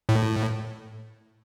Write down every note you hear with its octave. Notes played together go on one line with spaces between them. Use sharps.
A2